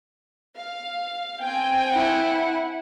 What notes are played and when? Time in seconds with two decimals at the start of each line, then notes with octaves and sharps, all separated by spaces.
0.56 F5
1.42 C4 G5 G#5
1.88 E4 F#5